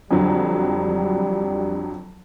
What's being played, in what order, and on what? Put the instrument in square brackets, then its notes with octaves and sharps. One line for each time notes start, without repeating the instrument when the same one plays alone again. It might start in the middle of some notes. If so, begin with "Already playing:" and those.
[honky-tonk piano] F2 D3 F#3 [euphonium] G3